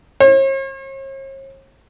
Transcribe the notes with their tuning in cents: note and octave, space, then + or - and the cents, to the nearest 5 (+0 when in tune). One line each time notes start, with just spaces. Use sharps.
C#5 -45